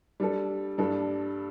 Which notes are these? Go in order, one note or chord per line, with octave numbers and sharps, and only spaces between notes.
G3 D4 A4
G2 G3 D4 A4